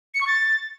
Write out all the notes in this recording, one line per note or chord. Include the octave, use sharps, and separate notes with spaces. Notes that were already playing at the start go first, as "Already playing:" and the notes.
C#7
C#6
A6